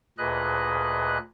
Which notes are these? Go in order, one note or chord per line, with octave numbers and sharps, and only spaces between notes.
D2 A#2 G#4 B4 D#5 F#6